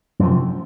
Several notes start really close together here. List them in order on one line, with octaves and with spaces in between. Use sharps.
F#2 F3 C3